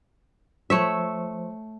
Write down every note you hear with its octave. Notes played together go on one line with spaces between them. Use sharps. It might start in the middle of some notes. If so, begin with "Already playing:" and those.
F3 A3 C5 C#5 E5